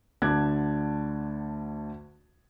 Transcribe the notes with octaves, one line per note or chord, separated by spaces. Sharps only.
D2 D3 A5 D6 F#6 G#6